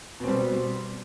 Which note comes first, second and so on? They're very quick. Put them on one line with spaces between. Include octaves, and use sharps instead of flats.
B2 C4 G3